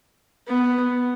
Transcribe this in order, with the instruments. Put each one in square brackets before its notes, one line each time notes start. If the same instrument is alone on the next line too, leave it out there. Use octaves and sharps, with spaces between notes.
[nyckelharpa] B3